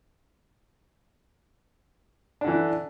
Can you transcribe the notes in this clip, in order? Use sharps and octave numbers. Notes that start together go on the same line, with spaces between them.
D3 E3 D4